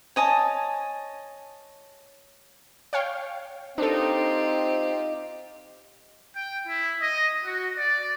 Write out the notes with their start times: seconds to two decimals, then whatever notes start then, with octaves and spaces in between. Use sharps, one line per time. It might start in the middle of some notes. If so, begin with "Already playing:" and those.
0.16 C#5 D#5 G#5 A5
2.93 C#5 F5 G5
3.78 C4 D4 D#4 F4 G4 A4
6.36 G5
6.68 E4
7.01 D#5
7.45 F#4
7.77 D5